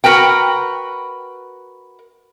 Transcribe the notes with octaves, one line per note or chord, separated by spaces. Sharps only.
F#4 A#4 B4 G5